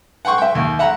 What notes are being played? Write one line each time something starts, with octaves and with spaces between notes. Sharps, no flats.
F#5 G5 C6 C#6
E5 G5
D#2
E5 F#5 A#5 B5